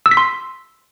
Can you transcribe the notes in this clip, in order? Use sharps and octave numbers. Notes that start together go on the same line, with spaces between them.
E6
B6
C6